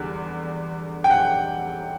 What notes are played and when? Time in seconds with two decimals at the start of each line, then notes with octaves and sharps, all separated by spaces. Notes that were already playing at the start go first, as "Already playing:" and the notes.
Already playing: E2 D3 G3
1.04 G5
1.10 F#5